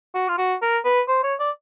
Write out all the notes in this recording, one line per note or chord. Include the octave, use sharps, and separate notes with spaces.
F#4
F4
F#4
A#4
B4
C5
C#5
D5